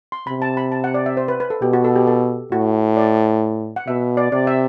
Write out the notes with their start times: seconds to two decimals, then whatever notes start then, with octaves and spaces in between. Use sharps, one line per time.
0.12 C6
0.27 C3 B5
0.42 A5
0.57 B5
0.72 A5
0.84 F#5
0.94 D5
1.06 E5
1.17 C5
1.28 B4
1.40 B4
1.50 A4
1.62 B2 G4
1.73 F#4
1.84 A4
1.96 G4
2.07 A4
2.52 A2 F#4
2.97 D5
3.76 F#5
3.87 B2 E5
4.17 D5
4.32 C3 D5
4.47 E5